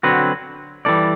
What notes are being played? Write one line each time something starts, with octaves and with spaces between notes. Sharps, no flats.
D3 F#3 C4 F#4 B4
E3 G3 D4 A4 D5